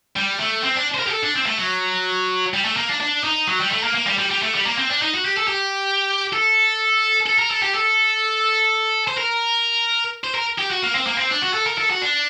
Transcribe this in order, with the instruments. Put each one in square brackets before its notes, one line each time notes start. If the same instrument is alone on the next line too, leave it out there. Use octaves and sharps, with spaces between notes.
[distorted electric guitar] G3
A3
C4
D4
C5
A#4
G4
A4
D4
C4
A3
F#3
G3
A3
A#3
D4
D4
D#4
F#3
G3
A3
A#3
A#3
G3
G3
G3
A3
G3
A#3
C4
D4
D#4
F#4
G4
A4
G4
A4
A4
A#4
A4
G4
A4
C5
A#4
C5
A#4
G4
F#4
A#3
C4
A#3
C4
D4
F#4
A4
A#4
A4
F#4
D4